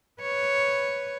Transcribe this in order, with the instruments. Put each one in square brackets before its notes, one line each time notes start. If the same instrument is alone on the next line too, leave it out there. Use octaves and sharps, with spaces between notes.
[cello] B4 C#5